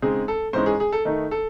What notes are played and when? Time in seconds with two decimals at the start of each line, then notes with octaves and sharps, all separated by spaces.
0.02 C#3 G#3 C4 D#4 G#4
0.28 A4
0.53 G#2 E3 G#3 C#4 C5
0.66 G#4
0.80 G#4
0.92 A4
1.05 D#3 A3 D#4
1.31 A4